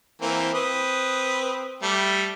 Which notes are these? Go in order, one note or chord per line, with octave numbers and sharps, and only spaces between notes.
E3 A#3 C4
C4 B4 D#6
G3 A3